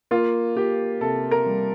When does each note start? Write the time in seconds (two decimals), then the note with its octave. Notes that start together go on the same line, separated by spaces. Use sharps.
0.11 A#3 F4
0.56 A#3 G4
1.01 C3 A4
1.31 A#4
1.46 G3